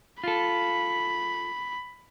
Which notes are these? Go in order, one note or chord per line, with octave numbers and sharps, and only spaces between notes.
F4 A4 B5